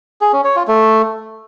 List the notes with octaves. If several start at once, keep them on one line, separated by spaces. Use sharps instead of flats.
G#4
C#4
C#5
F4
A3